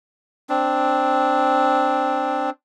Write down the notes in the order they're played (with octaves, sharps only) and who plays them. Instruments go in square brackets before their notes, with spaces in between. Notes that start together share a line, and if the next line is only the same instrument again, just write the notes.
[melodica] C4 D4